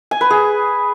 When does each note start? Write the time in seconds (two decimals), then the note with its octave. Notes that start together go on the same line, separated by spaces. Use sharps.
0.11 G#5
0.21 B4
0.30 G#4